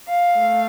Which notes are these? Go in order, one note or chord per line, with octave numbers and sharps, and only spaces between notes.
F5
A3